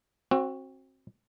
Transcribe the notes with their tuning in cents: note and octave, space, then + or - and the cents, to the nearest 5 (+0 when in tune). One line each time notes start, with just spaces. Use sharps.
C4 +30 F#4 +0